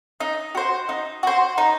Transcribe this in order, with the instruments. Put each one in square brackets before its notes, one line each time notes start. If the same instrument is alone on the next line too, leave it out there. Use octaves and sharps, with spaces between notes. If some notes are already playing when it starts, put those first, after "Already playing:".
[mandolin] D#4
F#4 C5
D#4
F#4 C5
D#4